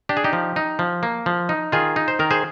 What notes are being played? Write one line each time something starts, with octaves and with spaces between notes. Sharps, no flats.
D4 G4
G#4
D#4 G4
F3
D#4
F3
A#3
F3
D#4
D#3 F4 G#4
D#4
C5
D#3 A#4
G#4 C5